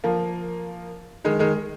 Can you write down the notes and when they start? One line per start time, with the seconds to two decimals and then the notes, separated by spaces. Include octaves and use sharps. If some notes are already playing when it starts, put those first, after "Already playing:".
0.04 F3 A#3
1.24 D#3 G#3
1.39 D#3 G#3